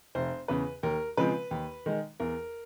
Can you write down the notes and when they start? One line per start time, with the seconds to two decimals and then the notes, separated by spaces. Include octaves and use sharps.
0.15 F1 C5
0.48 E2 C#3 B4
0.83 D#2 A#4
1.17 C#3 F3 G#3 C4 B4
1.51 D#2
1.86 D#3 G#3
2.20 E2 A#4